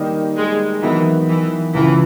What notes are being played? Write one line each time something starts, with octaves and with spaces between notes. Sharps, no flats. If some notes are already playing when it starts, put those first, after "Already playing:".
Already playing: D#3 G3 A#3 D#4
G#3
D#3 E3 F#3 B3 D#4
E3
C#2 C#3 E3 F3